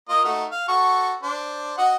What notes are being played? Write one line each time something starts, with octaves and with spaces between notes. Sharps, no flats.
A#3 F4 D#5
A3 D#4 F#4
F5
F#4 A4 C#6
D4 C5
F#4 D#5 F#5